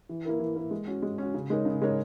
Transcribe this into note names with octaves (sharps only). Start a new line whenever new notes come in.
E3
A#3 E4 A#4
E3
A#3 E4 A#4
G#3
C#4 F#4
G#3
C#4 F#4
C#3
G#3 D#4 A#4 C#5
C#3
G#3 D#4 A#4 C#5